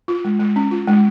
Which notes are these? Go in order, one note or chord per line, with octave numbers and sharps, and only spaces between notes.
F4
G#3
G#3
C#4
F4
G#3